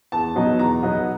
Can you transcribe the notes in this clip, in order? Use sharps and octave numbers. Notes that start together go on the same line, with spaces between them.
E2 A5
B2 F#3 B3 D#4
E2 A#5
B2 F#3 B3 D#4